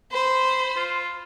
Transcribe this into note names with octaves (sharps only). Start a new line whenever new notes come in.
C5 B5
F4